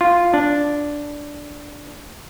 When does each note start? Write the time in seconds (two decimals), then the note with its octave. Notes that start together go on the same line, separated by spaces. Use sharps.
0.01 F4
0.34 D4